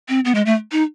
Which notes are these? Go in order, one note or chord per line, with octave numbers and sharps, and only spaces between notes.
C4
B3
G#3
A3
D#4